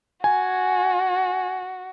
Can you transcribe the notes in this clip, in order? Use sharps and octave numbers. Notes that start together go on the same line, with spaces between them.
F#4 G#5